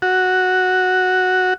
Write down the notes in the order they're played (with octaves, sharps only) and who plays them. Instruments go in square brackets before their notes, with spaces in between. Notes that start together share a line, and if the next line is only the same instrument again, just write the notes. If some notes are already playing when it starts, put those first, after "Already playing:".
[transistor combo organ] F#4